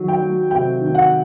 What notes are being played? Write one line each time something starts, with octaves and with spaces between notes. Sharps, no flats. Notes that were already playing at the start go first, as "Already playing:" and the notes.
Already playing: D#3 F#3
G5
F#3
C3 G5
D#3
F#5